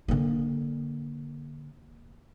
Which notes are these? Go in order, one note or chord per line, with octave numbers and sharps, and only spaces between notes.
D3 A#3